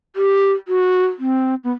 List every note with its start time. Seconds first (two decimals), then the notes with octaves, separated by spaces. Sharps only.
0.16 G4
0.68 F#4
1.19 C4
1.64 B3